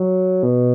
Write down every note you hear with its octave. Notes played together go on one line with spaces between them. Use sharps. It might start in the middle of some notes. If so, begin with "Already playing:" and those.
Already playing: F#3
B2